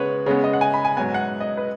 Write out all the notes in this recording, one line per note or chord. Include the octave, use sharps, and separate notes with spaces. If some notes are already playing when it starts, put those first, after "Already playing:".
Already playing: C#3 G#3 B3 B4 C#5 F#5
C#3 G#3 B3 C#5
D#5
F#5
G#5
B5
G#5
G#2 F#3 B3 G#5
F#5
D#5
B4